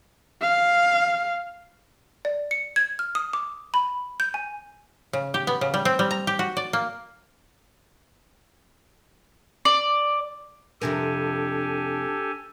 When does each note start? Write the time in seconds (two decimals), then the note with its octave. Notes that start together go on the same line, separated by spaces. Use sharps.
0.41 F5
2.25 D5
2.51 C#7
2.76 G#6
2.99 F6
3.15 D#6
3.33 D6
3.74 B5
4.20 G6
4.34 G#5
5.13 C#3
5.34 G4
5.47 B3
5.61 C#3
5.74 G3
5.85 C4
5.99 G3
6.11 A#5
6.27 G4
6.39 F#4
6.57 D5
6.73 A#3
9.65 D5
10.81 F2 C3 D4 G4 A4 A#4 G#5